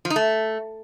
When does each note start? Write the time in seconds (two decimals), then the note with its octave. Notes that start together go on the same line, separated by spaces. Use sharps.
0.05 F3
0.10 D#4
0.16 A3